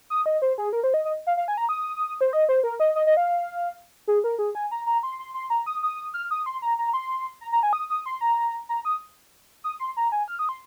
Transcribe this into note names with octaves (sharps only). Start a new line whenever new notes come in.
D#6
D#5
C5
G#4
A#4
C5
D#5
D#5
F5
F5
G#5
A#5
D#6
C5
D#5
C5
A#4
D#5
D#5
D#5
F5
G#4
A#4
G#4
G#5
A#5
A#5
C6
C6
C6
A#5
D#6
D#6
F6
D#6
C6
A#5
A#5
C6
A#5
A#5
G#5
D#6
D#6
C6
A#5
A#5
D#6
D#6
C6
A#5
G#5
F6
D#6
C6